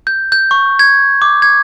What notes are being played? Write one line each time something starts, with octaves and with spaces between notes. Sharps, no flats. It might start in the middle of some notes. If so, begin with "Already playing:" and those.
G6
G6
C#6
G#6
D6
G#6